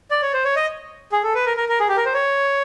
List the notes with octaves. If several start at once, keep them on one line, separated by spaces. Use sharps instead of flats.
D5
C#5
C5
C#5
D#5
G#4
A4
B4
A#4
A#4
A#4
G#4
G4
A#4
C5
C#5